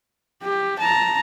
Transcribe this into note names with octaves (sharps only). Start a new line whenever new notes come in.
G4
A5 A#5